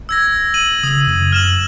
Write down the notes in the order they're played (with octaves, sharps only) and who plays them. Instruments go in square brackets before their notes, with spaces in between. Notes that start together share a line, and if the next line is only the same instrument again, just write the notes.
[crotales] E6 G#6 A#6
D#7 F#7
[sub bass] C#3 [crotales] D#6 F#7
[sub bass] F#2
[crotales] F6 E7 F#7